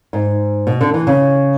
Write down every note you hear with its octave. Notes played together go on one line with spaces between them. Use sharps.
G#2
B2
D3
E3
C#3